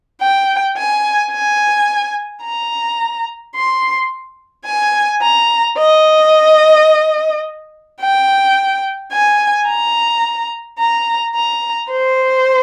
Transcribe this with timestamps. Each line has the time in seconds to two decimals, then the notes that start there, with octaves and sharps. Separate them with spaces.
0.22 G5
0.77 G#5
1.32 G#5
2.44 A#5
3.56 C6
4.67 G#5
5.23 A#5
5.79 D#5
8.01 G5
9.13 G#5
9.68 A#5
10.79 A#5
11.35 A#5
11.91 C5